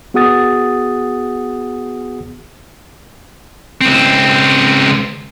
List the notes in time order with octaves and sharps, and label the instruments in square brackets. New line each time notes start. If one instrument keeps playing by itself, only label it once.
[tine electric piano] B3 F#4 G#4 F#5 D#6 A6
[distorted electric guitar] C#2 C4